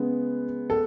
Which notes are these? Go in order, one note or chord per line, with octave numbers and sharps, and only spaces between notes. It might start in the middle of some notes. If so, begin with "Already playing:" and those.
Already playing: C#3 G#3 B3
A4